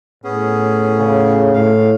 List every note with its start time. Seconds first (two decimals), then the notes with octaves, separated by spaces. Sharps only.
0.24 A2 B3 C#4 G#4
0.99 C#3
1.54 A2 F5